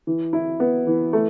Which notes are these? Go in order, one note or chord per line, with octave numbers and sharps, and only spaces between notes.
E3
E4
B3
E3
A3